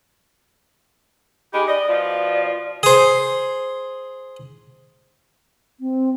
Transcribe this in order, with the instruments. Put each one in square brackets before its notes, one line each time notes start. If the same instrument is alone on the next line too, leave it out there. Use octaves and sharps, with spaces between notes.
[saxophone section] G#3 D#4 G4 [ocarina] B5
[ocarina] D5 [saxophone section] D#5
[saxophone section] B2 F3 F4
[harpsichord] G#4 C5
[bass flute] C4